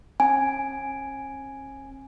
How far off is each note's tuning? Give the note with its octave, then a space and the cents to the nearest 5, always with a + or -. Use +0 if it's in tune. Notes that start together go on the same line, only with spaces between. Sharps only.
C#4 -45 G#5 +0